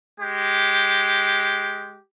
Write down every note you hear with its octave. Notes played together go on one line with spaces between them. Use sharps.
G#3 G4